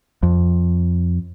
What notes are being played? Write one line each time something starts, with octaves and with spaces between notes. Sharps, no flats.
F2